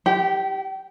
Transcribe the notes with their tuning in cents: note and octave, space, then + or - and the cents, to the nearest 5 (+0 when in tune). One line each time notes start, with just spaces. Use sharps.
G4 +0 G5 -35